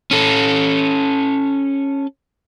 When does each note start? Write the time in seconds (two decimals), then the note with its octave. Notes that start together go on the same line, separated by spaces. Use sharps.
0.11 C#4 A4